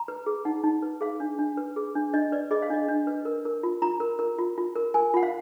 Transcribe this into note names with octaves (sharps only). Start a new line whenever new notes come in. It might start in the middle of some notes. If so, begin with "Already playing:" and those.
Already playing: A#5
B4
G#4
D#4 F#5
D#4
B4
G#4 F5
D4
D4
B4
G#4
D4
D4 D#5
B4 D5
G#4 D#5
F5
D4 D#5
D4
B4
A#4
A#4
F4
F4 A#5
A#4
A#4
F4
F4
A#4
A#4 G#5
F4 F#5
F5